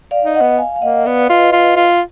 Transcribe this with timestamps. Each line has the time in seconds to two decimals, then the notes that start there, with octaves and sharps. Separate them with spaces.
0.11 D5 F5
0.23 D#4
0.35 D#5 F#5
0.41 B3
0.58 F5 G#5
0.76 F5
0.82 A#3 D#5 F#5
1.05 B3 D5 F5
1.29 F4 B4 D#5
1.52 F4
1.76 F4